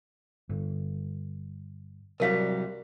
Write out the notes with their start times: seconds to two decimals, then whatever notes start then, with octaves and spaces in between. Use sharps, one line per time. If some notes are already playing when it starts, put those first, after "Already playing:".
0.49 G2 D3
2.20 C2 F#3 G3 A#4 F5